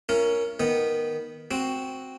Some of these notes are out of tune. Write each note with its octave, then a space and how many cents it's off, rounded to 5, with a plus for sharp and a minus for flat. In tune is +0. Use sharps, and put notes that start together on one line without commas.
C#4 +5 F4 -45 A#4 +0
D#3 +0 B3 -10
C4 +0 F#4 +0